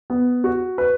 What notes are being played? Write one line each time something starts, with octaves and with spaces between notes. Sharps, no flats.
B3
F#4
B4